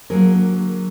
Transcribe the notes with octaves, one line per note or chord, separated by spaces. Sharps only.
D3 F#3 A#3 G#4 A#4